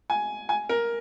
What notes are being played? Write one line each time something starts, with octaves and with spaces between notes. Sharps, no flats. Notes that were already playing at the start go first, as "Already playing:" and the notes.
G#5
G#5
A#4